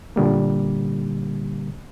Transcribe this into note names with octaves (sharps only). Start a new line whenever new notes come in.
A#2 D3 G3 A#3